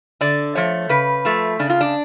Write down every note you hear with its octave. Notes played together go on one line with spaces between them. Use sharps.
D3 D5
F3 A3 C#5
C#3 B4
F3 A3
C#3 D4
F4
D4